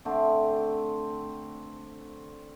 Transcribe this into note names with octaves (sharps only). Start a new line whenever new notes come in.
D3 A3 C4